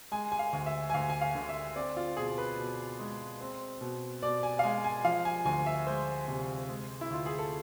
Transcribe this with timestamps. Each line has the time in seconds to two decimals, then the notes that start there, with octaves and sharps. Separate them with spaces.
0.11 G#3 G#5
0.32 G#5
0.39 F5
0.53 D2
0.66 E5
0.90 G#5
0.94 D2 F5
1.10 G#5
1.21 F5
1.35 D3
1.49 E5
1.76 C4 D5
1.97 F4
2.17 B2 G#4
2.38 B4
2.58 B2
3.00 G#3
3.41 C4
3.81 B2
4.22 B2 D5
4.43 G#5
4.59 F5
4.64 G#3 G#5
4.84 G#5
5.04 F3 F5
5.25 G#5
5.45 D2 G#5
5.66 E5
5.86 G#3 C5
6.28 C3
6.69 G#3
7.01 E4
7.10 D2 F4
7.26 G#4
7.39 A4